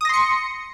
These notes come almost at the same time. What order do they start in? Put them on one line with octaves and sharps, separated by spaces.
D#6 A#6 C6 C#7